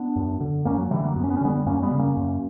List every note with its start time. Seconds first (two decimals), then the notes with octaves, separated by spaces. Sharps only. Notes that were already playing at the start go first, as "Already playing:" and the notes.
Already playing: B3 D4
0.16 F#2
0.40 D3
0.65 F#2 A#3 C#4
0.78 F#3 A#3
0.91 D3 E3 G3
1.03 F#3 A#3
1.16 F#2 B3
1.24 C#4
1.30 B3
1.37 C#4
1.41 D3 G3 B3
1.66 F#2 A#3 C#4
1.83 G3 B3
1.91 C#3
1.99 A#3 C#4
2.17 F#2